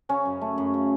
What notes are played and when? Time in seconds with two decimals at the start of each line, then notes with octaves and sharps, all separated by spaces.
0.09 C#3 C#4
0.25 F#2
0.41 A3
0.58 F#2
0.74 C#3